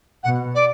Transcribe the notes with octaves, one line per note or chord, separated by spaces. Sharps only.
B2 F#5
D5